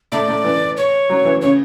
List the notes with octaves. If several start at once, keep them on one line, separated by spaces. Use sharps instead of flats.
A2 D5
A2
E3
C#5
F#3
E3
C#3 C#5